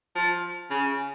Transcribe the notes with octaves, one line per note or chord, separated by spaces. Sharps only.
F3
C#3